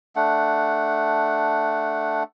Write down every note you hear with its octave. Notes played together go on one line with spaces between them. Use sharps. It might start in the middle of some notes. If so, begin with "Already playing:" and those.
A3 D4 F#5